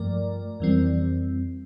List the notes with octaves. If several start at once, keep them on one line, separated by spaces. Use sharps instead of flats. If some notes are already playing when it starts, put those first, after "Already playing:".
Already playing: G2 F3 A3 A#4 D5
F2 E3 G3 C4